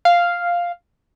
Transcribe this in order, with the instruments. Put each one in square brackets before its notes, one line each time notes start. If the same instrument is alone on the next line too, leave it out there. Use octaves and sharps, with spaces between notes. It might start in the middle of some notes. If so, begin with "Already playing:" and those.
[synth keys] F5